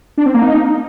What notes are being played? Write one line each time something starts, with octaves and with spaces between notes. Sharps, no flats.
D4
C4
A#3
D#4